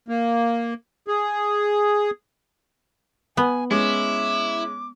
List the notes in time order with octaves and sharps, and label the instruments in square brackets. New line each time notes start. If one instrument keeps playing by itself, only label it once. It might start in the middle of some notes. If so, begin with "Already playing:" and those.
[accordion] A#3
G#4
[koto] B3 [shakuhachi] G#5
[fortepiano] G#3 C#4 [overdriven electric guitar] E4 [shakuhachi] D6